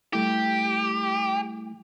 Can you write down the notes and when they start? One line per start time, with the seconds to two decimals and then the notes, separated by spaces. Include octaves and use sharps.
0.13 G3 A3 E4 G4